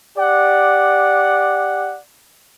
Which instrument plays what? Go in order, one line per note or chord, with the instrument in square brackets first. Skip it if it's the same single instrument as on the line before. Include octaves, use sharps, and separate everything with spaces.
[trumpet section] G4 D5 F#5